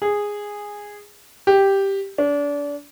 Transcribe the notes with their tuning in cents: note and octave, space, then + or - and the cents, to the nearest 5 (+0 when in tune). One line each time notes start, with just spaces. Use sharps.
G#4 -10
G4 +0
D4 -30